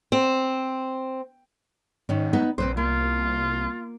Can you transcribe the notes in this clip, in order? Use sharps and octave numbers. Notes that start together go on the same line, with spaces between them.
C4
G#2 D#3 C#4
B3 D#4 B4
A#1 C4 B4 C5
C2 A#3 F4